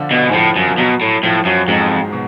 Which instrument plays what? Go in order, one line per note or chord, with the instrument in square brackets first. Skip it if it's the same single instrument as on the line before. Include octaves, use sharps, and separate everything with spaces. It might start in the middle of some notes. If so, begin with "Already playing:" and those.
Already playing: [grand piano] D3 F3 D4 F4
[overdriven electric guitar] B2
G#2
[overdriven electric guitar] A2 [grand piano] F3
[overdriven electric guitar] F#2
[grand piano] F3
[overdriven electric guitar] B2 [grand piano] F#3
[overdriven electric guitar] A2
[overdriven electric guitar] A2 [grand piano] F3
[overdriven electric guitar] F#2 [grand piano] F#3
[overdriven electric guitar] F2 [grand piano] G#2 G#3
[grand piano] B2